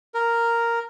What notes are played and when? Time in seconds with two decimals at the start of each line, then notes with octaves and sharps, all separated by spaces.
0.14 A#4